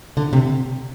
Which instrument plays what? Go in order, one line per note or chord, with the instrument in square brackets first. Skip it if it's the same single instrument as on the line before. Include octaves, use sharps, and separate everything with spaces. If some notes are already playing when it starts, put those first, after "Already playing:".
[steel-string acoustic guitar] D3
C3